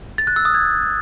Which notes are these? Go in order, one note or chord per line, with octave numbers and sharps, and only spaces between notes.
A6
F#6
E6
D#6
G#6